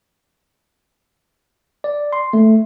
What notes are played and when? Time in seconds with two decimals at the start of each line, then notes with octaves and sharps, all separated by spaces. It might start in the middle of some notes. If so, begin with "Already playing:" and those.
1.84 D5
2.13 C6
2.33 A3